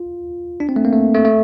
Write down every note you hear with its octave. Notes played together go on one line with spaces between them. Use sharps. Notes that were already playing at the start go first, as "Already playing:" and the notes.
Already playing: F4
D4
C4
A3
A#3
A3
A3
A3